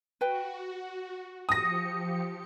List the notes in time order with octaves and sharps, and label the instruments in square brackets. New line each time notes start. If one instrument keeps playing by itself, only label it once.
[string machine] F#4 [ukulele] B4 G5
[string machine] F3 G4 C#7 [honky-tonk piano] D#6 A#6